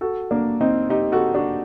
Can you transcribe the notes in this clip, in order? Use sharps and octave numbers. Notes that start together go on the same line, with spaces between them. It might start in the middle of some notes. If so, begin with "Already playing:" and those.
F#4 A4
A#3 D4
C4 D#4
D#4 G4
F#4 A4
D4 F#4